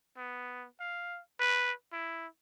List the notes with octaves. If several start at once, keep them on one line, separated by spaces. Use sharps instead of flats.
B3
F5
B4
E4